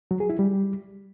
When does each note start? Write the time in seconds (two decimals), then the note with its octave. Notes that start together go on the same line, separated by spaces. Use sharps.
0.11 F#3
0.20 G#4
0.30 E4
0.39 G3